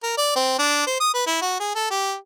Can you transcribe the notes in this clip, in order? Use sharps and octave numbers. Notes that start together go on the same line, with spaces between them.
A#4
D5
C4
D4
C5
D#6
B4
E4
F#4
G#4
A4
G4